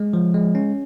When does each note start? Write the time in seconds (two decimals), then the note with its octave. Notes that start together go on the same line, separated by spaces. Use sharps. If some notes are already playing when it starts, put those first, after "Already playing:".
Already playing: G#3
0.14 F3
0.34 G#3
0.55 C#4